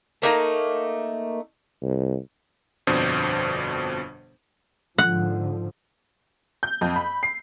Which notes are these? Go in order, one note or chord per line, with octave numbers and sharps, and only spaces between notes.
A3 A#3 D#4
C2
G1 F2 B2 D4 C5
G#2 D3 F3 F#5
G6
F2
B5
C7